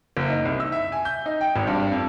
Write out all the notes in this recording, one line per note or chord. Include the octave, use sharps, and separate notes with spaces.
F#1
D#4
C2
E6
E5
G#5
G6
D#4
G5
G#1
G2
F2